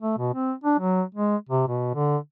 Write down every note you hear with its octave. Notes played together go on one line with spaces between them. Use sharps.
A3
B2
C4
D4
F#3
G#3
C3
B2
D3